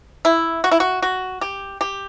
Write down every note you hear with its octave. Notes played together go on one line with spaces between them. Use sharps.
E4
F#4
E4
F#4
F#4
G4
G4